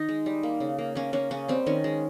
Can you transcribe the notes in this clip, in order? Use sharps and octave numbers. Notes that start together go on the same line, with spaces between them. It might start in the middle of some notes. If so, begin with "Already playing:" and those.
Already playing: D#3 D#4
G#3
G3
A#3
C#3
A#3
A#3 C#4
A#3 C#4
C#3 C#4
G3 C4
D#3 C#4
G#3